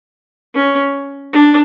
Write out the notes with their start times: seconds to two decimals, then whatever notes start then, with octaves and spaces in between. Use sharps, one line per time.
0.55 C#4
1.33 D4